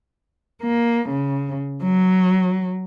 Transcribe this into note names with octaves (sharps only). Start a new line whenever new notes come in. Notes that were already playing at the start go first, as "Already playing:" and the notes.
A#3
C#3
F#3